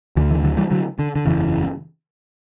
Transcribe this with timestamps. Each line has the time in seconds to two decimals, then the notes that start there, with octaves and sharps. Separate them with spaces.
0.16 D2 D3 E3
0.31 E3
0.44 D3 F#3
0.57 E3 G3
0.71 D3 F#3
0.99 D3
1.16 D3
1.25 F#1 E2 C#3 E3